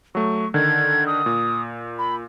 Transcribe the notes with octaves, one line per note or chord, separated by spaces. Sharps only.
F#3 A3 C#6
D3 D#3 G#6
D#6
A#2
B5